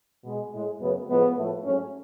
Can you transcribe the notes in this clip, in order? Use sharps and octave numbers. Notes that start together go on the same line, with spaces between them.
B2 G#3
A2 G#3
F#2 C#3 F#3 A3 B3
A2 F3 G#3 B3
A2 F3 A3
G#2 F#3 A3 C#4